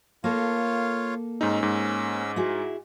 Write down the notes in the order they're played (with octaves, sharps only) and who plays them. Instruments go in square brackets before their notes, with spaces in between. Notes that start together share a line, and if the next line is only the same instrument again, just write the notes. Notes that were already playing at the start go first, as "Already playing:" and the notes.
[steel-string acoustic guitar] A#3 A4 [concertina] F4 C#5 F5
[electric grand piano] G#2 D#4 [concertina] C#4 E6
[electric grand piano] G#2
[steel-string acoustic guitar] E4 F#4 G#4